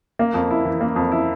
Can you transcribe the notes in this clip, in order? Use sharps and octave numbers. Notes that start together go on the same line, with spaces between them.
A#3
F2
E4
E3
A#3
F2
E4